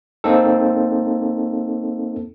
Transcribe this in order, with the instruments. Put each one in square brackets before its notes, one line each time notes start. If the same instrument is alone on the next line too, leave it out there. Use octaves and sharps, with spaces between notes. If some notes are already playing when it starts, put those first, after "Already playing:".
[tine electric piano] A#3 C4 D#4 A4